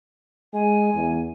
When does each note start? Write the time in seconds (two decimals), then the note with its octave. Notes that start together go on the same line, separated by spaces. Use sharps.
0.53 G#3 G#5
0.94 E2